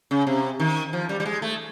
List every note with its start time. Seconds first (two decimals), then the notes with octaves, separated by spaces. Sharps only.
0.11 C#3
0.27 C3
0.60 D#3
0.93 F3
1.09 G3
1.20 G3
1.26 G#3
1.42 A3